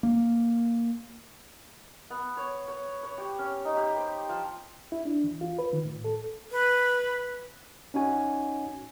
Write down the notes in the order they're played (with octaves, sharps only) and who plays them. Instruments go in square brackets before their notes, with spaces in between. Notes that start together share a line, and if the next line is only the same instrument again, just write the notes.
[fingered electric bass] A#3
[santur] B3
C#5
C#5
C#5
G4
C#4
D#4
G4
C5
F3
[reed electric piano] E4
D4
E3
F4
B4
D#3
A2
A4
[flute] B4
[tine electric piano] C#4 D#4 F#4 G#5